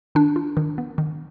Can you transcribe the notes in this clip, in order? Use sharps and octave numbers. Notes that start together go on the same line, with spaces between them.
D#3 D4
F4
D#3
B3
D#3